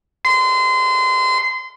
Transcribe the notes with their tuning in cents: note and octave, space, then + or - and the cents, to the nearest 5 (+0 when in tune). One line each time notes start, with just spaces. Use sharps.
C6 -30